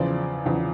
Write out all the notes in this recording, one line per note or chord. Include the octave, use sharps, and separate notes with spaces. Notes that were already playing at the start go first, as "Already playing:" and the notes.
Already playing: E2 C#3 F3 C5 D5
E2 C#3 F3